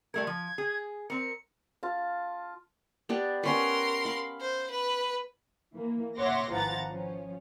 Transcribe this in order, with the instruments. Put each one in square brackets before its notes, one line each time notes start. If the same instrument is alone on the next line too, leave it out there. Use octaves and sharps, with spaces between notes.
[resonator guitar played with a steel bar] G3 A3 A#4 [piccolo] G#6
[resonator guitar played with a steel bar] F3
G#4
[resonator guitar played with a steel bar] C4 A#4 [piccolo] C#7
[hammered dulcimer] F4 F5 A5
[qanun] B3 D4 G4
[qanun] B3 C#4 B4 [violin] A#4 C6
[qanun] F5 B5
[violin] C5
B4
[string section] E3 A#3
C#5 E5 F#5 C6 D6 A#6
G#1 E3 F3 F#5 A#5 A6
F3 C#4